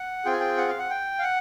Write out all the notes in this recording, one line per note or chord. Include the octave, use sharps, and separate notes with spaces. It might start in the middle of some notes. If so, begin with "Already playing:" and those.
Already playing: F#5
C4 F4 G#4 G5
G#5
G5
F#5
F5
F#5
G5
F5
F#5